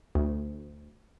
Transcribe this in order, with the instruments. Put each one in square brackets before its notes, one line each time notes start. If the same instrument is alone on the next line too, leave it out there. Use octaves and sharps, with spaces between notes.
[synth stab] D2